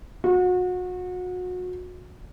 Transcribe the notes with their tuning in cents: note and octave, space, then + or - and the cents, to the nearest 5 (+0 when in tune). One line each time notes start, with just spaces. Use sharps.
F#4 -30